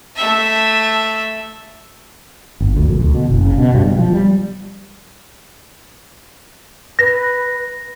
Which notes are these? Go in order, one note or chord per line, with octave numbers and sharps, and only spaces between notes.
A3 E5
G1
D2
A#1
D2
B2
F#1
C#3
B2
G2
B2
F3
G3
B4 A#6